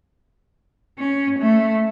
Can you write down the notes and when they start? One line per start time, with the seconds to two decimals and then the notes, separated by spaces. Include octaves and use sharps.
0.98 C#4
1.38 A3